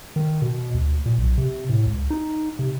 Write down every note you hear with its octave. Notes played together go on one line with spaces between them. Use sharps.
D#3
B2
D2
A#2
B1
C3
A2
C#2
D#4
C3